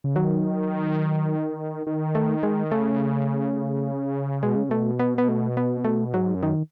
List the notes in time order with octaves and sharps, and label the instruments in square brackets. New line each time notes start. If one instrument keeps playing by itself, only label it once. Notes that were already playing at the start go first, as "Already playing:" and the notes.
[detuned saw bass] C#3
[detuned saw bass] D#3 [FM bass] F#3
[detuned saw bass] D#3
[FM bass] A3
G#3
[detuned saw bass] C#3 [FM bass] A3
[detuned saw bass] B2 [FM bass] G#3
[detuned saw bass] C#3
[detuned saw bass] B2 [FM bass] A3
[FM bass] B3
B3
A3
B3
A3
[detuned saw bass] G#2 [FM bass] F#3
[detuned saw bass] F#2
[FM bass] D#3